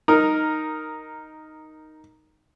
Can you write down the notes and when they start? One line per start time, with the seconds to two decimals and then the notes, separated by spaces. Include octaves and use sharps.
0.08 D#4 A#4